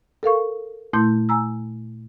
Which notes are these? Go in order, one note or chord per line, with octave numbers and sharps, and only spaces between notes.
A4 A#4 F5 C#6
A#2 A3 E4 C6 G6
G#5 A#5 E6